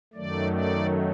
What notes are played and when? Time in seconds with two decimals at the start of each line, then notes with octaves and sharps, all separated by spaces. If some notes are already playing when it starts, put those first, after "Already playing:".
0.14 F#2 D#3 F#3 A3 D5
0.52 D5